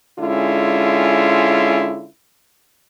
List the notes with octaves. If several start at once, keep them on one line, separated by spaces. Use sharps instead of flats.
D3 G#3 C#4 E4 F4